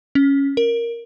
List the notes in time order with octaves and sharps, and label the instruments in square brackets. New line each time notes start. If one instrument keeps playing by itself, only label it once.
[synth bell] C#4
A#4